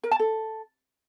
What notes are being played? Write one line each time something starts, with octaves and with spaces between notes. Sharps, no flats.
A#4
A5
A4